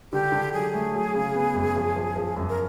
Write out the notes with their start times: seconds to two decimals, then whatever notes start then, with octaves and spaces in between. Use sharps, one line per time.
0.12 D3 G4
0.32 D3
0.53 F#3 G#4
0.74 A3
0.94 F#3
1.15 C#3
1.35 B3
1.55 F#2
1.76 F3
1.96 F3
2.16 F3
2.36 F#2
2.49 A#4